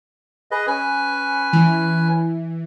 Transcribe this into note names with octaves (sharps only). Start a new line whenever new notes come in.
G#4 B4 D#5
C#4 B4 G#5
E3